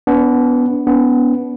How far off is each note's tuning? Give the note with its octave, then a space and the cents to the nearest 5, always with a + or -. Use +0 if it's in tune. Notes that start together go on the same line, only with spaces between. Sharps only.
B3 +0 D4 -35
B3 +0 D4 -45